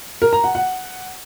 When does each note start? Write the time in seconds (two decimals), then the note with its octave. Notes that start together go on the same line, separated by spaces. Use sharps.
0.22 A#4
0.33 A#5
0.44 F#5
0.55 F#5